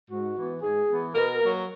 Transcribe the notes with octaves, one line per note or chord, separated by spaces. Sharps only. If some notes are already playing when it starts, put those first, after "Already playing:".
G#2 F#4
E3 B3
G#2 G#4
E3 B3
B2 A#4
F#3 A#3